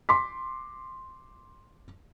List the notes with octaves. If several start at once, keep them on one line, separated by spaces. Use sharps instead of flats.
C6 D6 B6